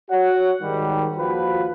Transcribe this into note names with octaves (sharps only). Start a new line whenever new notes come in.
F#4 C#5 F#5
G#2 D#3 G3
D#2 F3 F4 F#4 B4